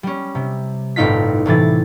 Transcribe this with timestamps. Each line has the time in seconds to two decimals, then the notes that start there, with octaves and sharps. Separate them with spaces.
0.03 G3 C#4
0.35 C3
0.96 G1 A2 C4 D#4 F4 B6
1.46 A2 C3 E3 A6